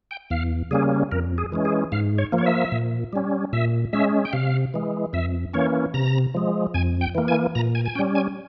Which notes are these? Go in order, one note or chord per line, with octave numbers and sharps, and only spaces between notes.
G5
E2 F5
C#3 G3 A#3 C#4 G#4
F2 A#4
G#4
E3 G#3 C#4
G#4
G#2 F5
C#5
F3 A#3
C#5
E5
A#2
G3 C#4
A#2 E5
G#3 C#4 E5
G5
C3 F5
E3 G#3
F2 E5
E3 A#3 C#4 C#5
C3 A#5
F3 G#3
F2 G#5
G5
E3 A#3
G#5
A#2 A#5
G#5
G#5
G3 C#4 G5
G#5